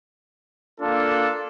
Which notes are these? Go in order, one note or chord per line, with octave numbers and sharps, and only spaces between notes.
A#3 D4 F4 A4